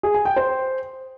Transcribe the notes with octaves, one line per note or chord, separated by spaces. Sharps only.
G#4
G#5
G5
C5